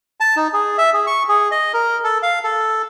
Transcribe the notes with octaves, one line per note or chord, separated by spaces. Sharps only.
A5
D#4
G#4
E5
G#4
C#6
G#4
D#5
A#4
A4
F5
A4